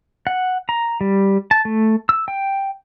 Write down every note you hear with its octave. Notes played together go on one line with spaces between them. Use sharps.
F#5
A#5
G3
A5
A3
E6
G5